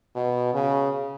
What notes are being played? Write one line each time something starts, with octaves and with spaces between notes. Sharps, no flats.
B2
C#3